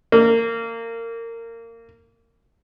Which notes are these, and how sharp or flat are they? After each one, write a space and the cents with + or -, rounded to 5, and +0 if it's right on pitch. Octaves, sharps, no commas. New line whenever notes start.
A#3 -25